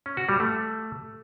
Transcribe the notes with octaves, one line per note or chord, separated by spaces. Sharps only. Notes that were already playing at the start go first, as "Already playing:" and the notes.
C#4
F#4
G3
A3